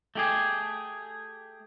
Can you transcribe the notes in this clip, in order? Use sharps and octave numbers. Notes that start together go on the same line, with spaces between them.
A3 G4 G#4